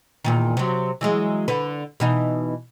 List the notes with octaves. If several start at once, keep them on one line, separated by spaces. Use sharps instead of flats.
E2 A#2 D#3
C3 F#3
E3 F#3 G#3
D3 B4
B2 E3 D#4